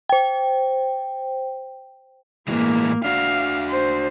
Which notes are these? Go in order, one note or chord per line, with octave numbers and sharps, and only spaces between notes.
C5 G5
A2 E3 G#3 A#3
D4 F#4 F5
C5